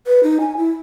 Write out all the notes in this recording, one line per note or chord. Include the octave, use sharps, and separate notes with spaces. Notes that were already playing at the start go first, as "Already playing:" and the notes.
B4
D#4
G#5
E4